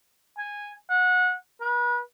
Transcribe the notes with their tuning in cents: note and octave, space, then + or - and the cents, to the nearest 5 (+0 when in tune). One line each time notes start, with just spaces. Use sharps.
G#5 -10
F#5 -25
B4 -35